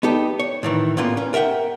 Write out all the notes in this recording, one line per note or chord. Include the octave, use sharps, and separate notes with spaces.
B3 D#4 G4 A4
C#5
A2 D#3 E3
A2 D3 A#3 B3 C#4 F4
C#4
A#4 E5 F#5 G5